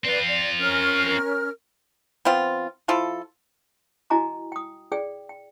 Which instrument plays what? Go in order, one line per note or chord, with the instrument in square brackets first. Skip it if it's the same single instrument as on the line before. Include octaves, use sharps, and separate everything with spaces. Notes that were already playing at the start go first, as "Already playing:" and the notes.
[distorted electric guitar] C4 F4 [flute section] B4 D5
[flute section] D5
C#4 A#4 F6
[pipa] F3 B3 C4 F4
F3 E4 F4 A4
[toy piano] E4 F#4 D#5 G#5 A#5 D6
G5 D#6
G#4 D5 G5
G5